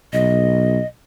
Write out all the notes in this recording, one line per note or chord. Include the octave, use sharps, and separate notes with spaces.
B1 D#5